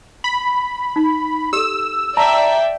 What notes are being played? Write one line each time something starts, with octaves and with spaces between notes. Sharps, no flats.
B5
D#4
G4 A4 E6
D5 E5 G5 A5 A#5